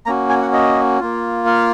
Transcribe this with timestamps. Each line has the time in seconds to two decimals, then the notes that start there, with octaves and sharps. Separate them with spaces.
0.06 A#3 C#4 F#4 A#5
0.30 G#5
0.42 F#5
0.53 D#5
1.00 A#3 F4
1.46 F5